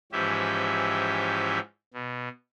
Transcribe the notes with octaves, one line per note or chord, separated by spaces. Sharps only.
G#2 E3 F3 C#4 G4 E5
B2